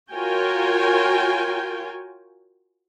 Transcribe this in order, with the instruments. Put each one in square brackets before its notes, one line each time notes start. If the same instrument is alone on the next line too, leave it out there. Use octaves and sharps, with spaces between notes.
[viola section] F4 F#4 A#4 C#5 G5 G#5